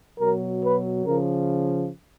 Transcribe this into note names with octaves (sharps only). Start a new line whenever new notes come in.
B2 F#3 A#4
B4
C#3 F3 A#4